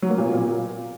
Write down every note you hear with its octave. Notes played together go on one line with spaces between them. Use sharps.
F#3
A#3
A#2
B2
A#2